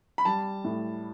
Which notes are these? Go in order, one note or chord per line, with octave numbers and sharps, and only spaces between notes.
B5
G3 A5
A2